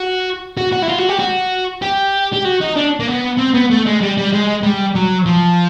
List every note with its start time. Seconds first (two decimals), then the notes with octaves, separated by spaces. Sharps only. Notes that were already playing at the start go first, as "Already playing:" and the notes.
Already playing: F#4
0.57 F#4
0.72 F#4
0.83 E4
0.89 F4
0.99 F#4
1.09 G4
1.19 F#4
1.82 G4
2.33 G4
2.45 F#4
2.61 D#4
2.76 D4
3.00 A#3
3.08 B3
3.38 C4
3.54 B3
3.71 A3
3.86 G#3
4.01 G3
4.17 G3
4.33 G#3
4.63 G3
4.95 F#3
5.26 F3